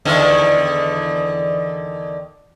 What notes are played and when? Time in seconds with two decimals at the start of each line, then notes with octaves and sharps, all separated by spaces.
0.05 E2 D3 D#3